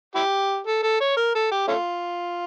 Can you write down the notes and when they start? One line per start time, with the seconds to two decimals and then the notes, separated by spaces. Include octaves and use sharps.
0.15 E4 G4
0.67 A4
0.83 A4
1.01 C#5
1.17 A#4
1.35 A4
1.51 G4
1.68 A3 C#4 F4